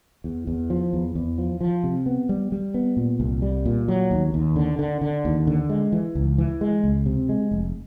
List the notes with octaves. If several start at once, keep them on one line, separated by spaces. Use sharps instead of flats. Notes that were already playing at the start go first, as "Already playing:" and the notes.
E2
E2
F3
E2
E2
F3
F3
C3
B3
G3
G3
B3
A#2
C2
G3
A#2
F#3
D#2
D#2
D3
D3
D3
D#2
D3
G#3
E3
C#2
E3
G#3
C#2
C3
G#3
F1